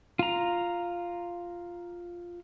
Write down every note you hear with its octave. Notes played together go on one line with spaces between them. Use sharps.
F4 A#5